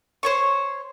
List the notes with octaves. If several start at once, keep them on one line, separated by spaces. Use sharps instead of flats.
C5 C#5 C#6